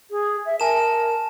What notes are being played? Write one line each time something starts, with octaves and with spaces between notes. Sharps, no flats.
G#4
E5
A#4 G#5 A5 E7